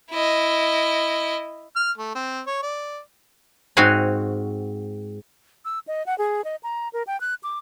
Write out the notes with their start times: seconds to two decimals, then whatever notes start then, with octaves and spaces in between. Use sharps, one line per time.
0.11 E4 D#5
1.76 F6
1.98 A3
2.15 C4
2.47 C#5
2.63 D5
3.77 G#2 C4 F#4 F5 G#5 B5
5.65 E6
5.88 D#5
6.06 F#5
6.18 G#4
6.44 D#5
6.63 A#5
6.93 A#4
7.07 G5
7.21 F#6
7.43 D6